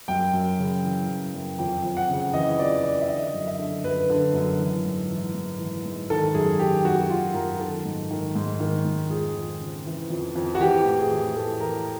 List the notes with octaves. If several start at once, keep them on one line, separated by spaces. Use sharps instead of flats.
F#2 G5
F#2
C#3
E3
F#2
F#2
F2 G5
F2
F#5
C#3
E3 D#5
F2 D5
F2 D5
E5
D3 D#5
F#2
E5
D3
F#2 B4
D3
F#2
E3
G#2
E3
G#2
E3
G#2
D#3 A4
F#2 G#4
D#3 G4
F#2 F#4
F#4
D#3 F4
F#2 A#4
D#3 A4
G#2
D#3
G#2
D#3
G#2
F2 G#4
F2
C#3
E3
F2
F2
F#4
E3 G4
A2
G#4
E3
A2 A4
E3 A#4